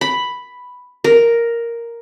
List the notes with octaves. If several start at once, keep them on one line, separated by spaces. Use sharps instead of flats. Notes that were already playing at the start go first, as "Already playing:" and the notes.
B5
A#4